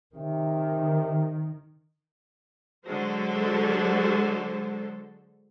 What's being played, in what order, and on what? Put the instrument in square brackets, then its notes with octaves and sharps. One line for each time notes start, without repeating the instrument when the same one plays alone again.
[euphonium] C3 [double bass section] D#3
[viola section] D3 F#3 G#3 A4 C5